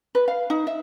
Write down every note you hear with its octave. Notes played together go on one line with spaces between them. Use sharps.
B4
F5
D#4
E5